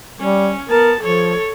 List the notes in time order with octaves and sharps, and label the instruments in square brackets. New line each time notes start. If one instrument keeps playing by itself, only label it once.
[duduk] G3 [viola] C#4
[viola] B3 A5 [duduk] A#4
[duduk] F3 [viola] A4 C#5